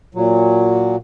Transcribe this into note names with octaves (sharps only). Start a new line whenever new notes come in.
A#2 F#3